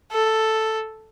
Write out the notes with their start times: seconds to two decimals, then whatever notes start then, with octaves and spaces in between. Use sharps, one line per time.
0.12 A4